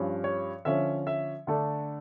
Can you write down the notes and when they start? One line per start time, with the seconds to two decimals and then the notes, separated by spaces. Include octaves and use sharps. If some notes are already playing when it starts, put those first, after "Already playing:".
Already playing: G2 F3 C#4
0.24 C#5
0.65 D3 F3 C#4 E5
1.07 E5
1.47 D3 A3 D4